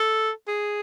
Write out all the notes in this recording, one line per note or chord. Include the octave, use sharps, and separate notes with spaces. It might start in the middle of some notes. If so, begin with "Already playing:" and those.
Already playing: A4
G#4